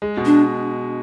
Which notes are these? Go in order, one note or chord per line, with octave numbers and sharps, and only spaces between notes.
G#3
B2
D4